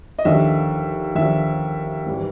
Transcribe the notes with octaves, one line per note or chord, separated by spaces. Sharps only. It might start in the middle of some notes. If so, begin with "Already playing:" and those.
D#5
D#2 D3 F3 E5
D#2 D3 F3 E5
G#2 E3 G3